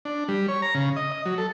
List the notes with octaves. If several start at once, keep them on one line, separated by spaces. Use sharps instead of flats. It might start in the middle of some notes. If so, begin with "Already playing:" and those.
D4
G3
C#5
A#5
C#3
D#5
D#5
F#3
A4